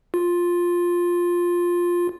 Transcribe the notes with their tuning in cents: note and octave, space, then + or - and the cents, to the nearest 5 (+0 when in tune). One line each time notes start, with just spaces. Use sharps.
F4 +5